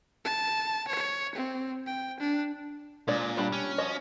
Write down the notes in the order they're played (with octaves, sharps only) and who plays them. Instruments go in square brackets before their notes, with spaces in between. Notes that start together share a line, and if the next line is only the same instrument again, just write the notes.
[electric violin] A5
C#5
C4
G5
D4
[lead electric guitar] A#2 [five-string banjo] G#3 D4 D5
[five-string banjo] G3 D4 B5
[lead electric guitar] C#4
[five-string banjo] F3 F#4 D#5